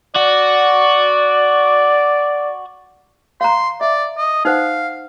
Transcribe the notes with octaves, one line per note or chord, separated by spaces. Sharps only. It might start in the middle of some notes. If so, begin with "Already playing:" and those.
F#4 D5
F5 A#5 C6
D5 E5
D#5
D#4 C5 F5 F#5